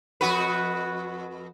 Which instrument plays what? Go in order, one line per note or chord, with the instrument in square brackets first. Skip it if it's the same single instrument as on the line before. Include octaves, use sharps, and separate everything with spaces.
[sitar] F2 F#4 B4